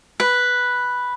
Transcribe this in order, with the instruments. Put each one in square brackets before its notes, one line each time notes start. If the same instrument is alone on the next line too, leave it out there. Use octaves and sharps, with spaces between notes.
[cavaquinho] B4